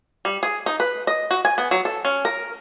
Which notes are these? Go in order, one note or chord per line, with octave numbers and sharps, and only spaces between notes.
G3
G#4
D#4
B4
D#5
F#4
G#5
B3
F#3
A4
C#4
A#4